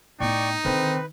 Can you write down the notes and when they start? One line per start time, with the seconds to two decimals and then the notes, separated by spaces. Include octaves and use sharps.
0.20 A2 B3 D#4 D5 G5 C#6
0.65 D3 D#3 C4 B4